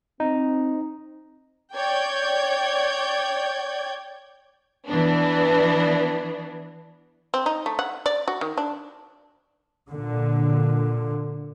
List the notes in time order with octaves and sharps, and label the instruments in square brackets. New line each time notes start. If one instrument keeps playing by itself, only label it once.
[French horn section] C4 [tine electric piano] D#4
[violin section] C#5 D5 G5 G6 G#6
[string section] E3 B3 D4
[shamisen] C4
D#4
A3
F#5
D5
F#4
D#3
D4
[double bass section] A#2 D3